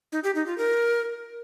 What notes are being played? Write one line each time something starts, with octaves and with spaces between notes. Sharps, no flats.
D#4
G4
D#4
F4
A#4